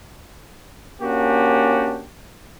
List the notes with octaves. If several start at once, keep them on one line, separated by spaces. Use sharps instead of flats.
A#3 C#4 D4 F#4 G4